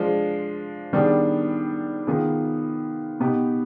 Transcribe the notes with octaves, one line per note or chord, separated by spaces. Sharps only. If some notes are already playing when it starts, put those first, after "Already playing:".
Already playing: F3 G#3 D4
D#3 G3 B3 D4 G#4
D#3 B3 F4 G#4
B2 B3 D#4 G4